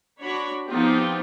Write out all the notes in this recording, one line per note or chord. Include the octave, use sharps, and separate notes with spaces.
D4 F#4 C#5 B5
F3 B3 C4 D#4 F4 G4